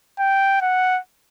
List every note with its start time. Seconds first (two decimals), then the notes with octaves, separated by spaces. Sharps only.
0.19 G5
0.61 F#5